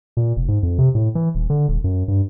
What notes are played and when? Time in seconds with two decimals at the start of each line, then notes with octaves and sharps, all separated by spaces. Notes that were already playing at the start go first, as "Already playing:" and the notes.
0.17 A#2
0.36 F1
0.48 G#2
0.63 F2
0.79 C3
0.95 A2
1.15 E3
1.35 D#1
1.50 D3
1.68 D#1
1.84 F#2
2.08 G2